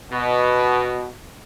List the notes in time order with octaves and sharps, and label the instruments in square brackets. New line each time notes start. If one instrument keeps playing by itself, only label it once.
[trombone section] B2